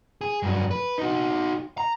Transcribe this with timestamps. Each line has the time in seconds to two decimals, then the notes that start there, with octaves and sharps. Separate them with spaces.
0.21 G#4
0.42 G2 F#3
0.71 B4
0.98 D#4 F#4
1.78 A#5